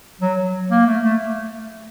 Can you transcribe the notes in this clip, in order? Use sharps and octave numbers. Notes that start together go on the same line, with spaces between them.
F#3
A#3
A3
A3